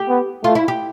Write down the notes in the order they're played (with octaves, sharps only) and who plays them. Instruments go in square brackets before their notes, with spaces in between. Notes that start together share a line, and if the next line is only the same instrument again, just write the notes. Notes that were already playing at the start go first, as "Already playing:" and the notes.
Already playing: [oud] G4
[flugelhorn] B3
[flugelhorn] A3 [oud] F4
[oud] E4
G4